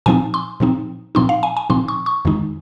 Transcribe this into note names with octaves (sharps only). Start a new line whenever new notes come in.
A#2 F3 C4 D#4 G#5
C6
A#2 F3 C4 D#4
A#2 F3 C4 D#4 C6
F5
G#5
G#5
A#2 F3 C4 D#4 C6
C#6
C#6
F2 D#3 G#3 D#4